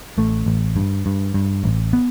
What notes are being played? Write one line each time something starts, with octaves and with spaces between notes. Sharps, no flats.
A1 A3
A1
G2
G2
G2
A1
B3